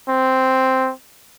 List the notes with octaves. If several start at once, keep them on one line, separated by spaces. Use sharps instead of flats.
C4